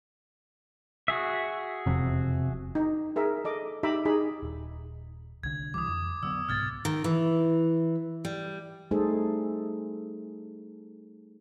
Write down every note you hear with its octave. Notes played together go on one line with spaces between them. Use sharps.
F#4 G#4 E5
E1 F2 C3
D#4
G#4 A#4 E5
A4 D#5 D6
D#4 G4 E5 A#5 B5 D6
D#4 G#4 B5
D#1
C2 D3 G#6
C2 E3 G3 D6 D#6
F2
D3 F#3 B3 E6
C2 G#2 B2 F6 G#6 A6
D#3
E3
G3
G3 A3 D#4 G#4 A4 C5